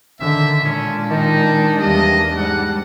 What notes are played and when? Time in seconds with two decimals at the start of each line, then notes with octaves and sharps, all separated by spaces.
0.20 D3 D#3 E5
0.64 A#2 G#3 C#4 D4
1.10 D#3 D#4
1.80 E2 G3 A#3 D#5
2.37 G#2 G3 F#5